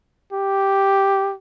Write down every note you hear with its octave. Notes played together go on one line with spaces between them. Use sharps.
G4